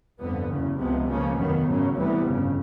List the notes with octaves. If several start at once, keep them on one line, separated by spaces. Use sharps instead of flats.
G1 F2 D3 G3 B3
F#1 E2 C#3
C#2 C3 F3 G#3 B3
C#2 C#3 F3 A#3 C#4
F1 D#2 D#3 F#3 B3
G#1 F#2 C#3 F#3
D2 C3 E3 G3 B3
G1 F2 C#3